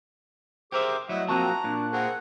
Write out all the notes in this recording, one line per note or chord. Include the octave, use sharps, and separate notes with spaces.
G4 G#4 A#4 C5 E5 D6
F#3 G3 A3 E4 D#5 F#5
F3 A#3 C4 F#4 A5 A#5 C#6 F#6
A#2 D4
C4 G#4 A#4 F#5